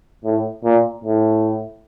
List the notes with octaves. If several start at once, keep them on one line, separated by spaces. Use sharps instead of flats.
A2
A#2
A2